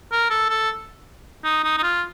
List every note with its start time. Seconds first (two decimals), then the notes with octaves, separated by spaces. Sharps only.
0.12 A#4
0.30 A4
0.50 A4
1.44 D#4
1.64 D#4
1.78 D#4
1.83 F4